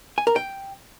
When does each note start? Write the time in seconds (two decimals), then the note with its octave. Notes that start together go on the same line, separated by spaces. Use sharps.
0.18 G#5
0.27 A#4
0.36 G5